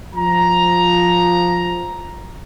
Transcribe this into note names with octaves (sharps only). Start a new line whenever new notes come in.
F3 A#5